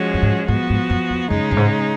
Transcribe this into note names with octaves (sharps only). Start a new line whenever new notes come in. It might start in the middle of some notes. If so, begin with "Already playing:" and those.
Already playing: F3 G#3 C#4 F#4
F#2
G#2
G#2 F3 B3 F#4
G#2
F#2
F2
F#2 C#3 G#3 D#4
F#2
G#2